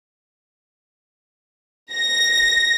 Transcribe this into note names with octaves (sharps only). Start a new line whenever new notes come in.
A#6